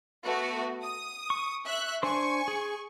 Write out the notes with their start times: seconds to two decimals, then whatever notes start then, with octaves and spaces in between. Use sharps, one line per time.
0.24 A3 B3 F#4
0.83 D#6
1.30 C#6
1.65 E5 F#6
2.03 D4 C5 G#5 C#6
2.48 G#4